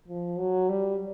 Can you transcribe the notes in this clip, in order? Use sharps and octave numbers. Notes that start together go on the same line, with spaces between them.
F3
F#3
G3